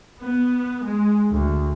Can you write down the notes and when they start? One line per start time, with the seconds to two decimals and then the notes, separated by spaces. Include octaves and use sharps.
0.20 B3
0.83 G#3
1.31 D2